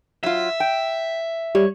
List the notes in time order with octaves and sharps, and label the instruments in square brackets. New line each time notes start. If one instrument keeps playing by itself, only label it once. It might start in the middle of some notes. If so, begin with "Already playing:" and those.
[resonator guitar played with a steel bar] F#3 F4 [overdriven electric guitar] E5
[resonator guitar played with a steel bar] G5
[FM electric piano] G3 [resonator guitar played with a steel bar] C#5